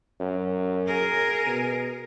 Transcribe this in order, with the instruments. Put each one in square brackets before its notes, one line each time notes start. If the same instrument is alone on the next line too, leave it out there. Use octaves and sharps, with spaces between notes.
[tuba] F#2
[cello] G#4 A#4
[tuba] B2